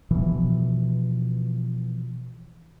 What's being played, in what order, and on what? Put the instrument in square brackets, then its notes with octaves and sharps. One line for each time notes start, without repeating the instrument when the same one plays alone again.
[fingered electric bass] B2 E3 F3